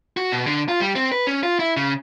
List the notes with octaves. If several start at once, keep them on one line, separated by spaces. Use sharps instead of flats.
F#4
B2
D3
F4
G3
C4
B4
C#4
F4
E4
C#3